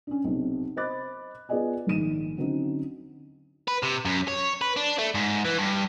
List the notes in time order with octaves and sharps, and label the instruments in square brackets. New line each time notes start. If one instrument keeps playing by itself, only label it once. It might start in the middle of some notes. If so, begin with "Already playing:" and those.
[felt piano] C#4 D4
B1 C3
C5 D#5 B5 D6 F#6 A6
B3 F4 G#4 D5 D#5 G#5
A#1 G#2 D#3 D#7 E7
D3 F#3 C4 C#4 D#4
[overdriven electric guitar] B4
C3
F#2
C#5
B4
D4
A3
G#2
E3
G2